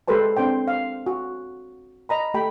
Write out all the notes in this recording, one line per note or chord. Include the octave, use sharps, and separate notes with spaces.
G#3 G4 A4 B4 C5 A5
C4 D4 C5 G5
F5
F#4
D#5 A#5 B5
A3 G4 G5 B5